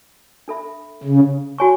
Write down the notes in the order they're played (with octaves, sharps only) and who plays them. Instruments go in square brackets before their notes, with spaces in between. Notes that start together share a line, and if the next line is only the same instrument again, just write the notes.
[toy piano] D4 A4 E5 B5
[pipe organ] C#3
[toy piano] F#4 C#5 G#5 C#6